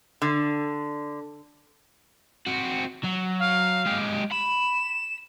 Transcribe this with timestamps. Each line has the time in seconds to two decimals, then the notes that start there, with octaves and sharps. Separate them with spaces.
0.22 D3
2.46 C4 F#4
3.04 F#3
3.39 F5
3.86 G#3 G4
4.31 B5 E7